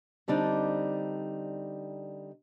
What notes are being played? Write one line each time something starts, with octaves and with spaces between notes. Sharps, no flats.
D3 G3 C4 D4 D#4